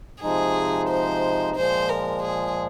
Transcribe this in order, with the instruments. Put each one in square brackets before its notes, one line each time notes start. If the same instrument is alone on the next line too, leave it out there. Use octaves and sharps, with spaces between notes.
[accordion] C3 F3 G#3 D#4 [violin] G#4
[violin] C5
[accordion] A#2 F3 G#3 [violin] C5
[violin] A#4
G#4